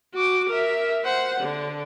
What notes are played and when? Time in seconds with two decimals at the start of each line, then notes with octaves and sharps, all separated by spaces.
0.14 F#4 D6
0.49 A#4 E5
1.04 C5 F#5
1.40 D3